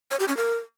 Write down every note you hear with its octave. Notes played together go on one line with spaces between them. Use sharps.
C#5
G4
C#4
A#4